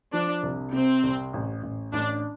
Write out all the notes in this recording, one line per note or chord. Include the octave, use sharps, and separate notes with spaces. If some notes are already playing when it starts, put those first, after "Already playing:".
F3 D4
C2
C3 C4
C2
A1
A1
A1 D4